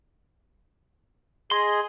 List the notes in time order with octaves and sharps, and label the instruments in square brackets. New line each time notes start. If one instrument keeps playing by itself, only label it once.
[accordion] G#4 D#5 [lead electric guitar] C6